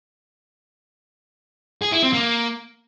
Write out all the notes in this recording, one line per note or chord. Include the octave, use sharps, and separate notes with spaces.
G#4
E4
C4
A#3